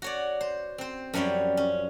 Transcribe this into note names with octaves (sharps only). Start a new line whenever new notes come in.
F#4 C#5 D5
C5
C4 C5
F#2 F3 G3 C#5 G5
C#4